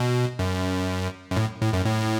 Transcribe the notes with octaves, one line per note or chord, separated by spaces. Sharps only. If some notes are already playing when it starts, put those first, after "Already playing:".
Already playing: B2
F#2
F#2
A2
A2
F#2
A2